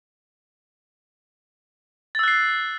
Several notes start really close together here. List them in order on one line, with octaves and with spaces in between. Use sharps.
A6 E6 F#6 C7